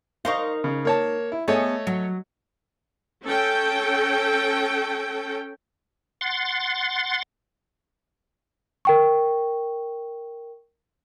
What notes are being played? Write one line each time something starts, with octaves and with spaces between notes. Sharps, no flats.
D#4 A#4 C5 F5 C#6
C#3
A#3 C#5 A5
E4
A3 B3 G#4 A4 C#5 D#5
F#3
C#4 A4 G5
F#5 C6 A6
A#4 G5 C#6